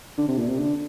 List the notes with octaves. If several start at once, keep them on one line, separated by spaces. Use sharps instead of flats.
D3
C3
A#2
C3
D3